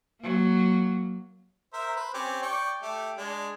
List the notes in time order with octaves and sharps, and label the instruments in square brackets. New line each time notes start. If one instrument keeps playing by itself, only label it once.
[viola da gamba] F#3 A#3
[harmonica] A#4 C5 E5
B4 C5
C4 C#4 G4
D5 G5 C#6
A3 G4
G#3 D4